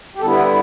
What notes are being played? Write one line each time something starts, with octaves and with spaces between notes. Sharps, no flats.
G4
D3 G3 B3 E4 A4
B4